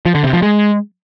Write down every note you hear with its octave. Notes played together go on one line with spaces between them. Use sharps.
F3
D3
C3
F3
G#3